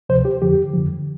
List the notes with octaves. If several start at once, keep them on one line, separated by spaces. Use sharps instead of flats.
D2 C3 F3 C5
G4
F2 D3 F3 G4
F2 D3 F3